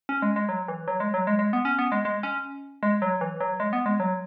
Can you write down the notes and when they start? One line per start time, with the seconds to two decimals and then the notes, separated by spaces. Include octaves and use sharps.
0.09 C#4
0.22 G#3
0.36 G#3
0.49 F#3
0.68 E3
0.88 F#3
1.00 G#3
1.14 F#3
1.27 G#3
1.39 G#3
1.53 B3
1.65 C#4
1.79 B3
1.92 G#3
2.05 G#3
2.23 C#4
2.83 G#3
3.02 F#3
3.21 E3
3.40 F#3
3.60 G#3
3.73 B3
3.86 G#3
4.00 F#3